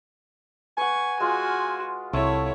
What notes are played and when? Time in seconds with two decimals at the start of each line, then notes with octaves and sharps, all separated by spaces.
0.78 B4 F#5 G#5 C#6
1.20 G#3 F4 F#4 F#5
2.13 C2 A3 E4 C#5 A5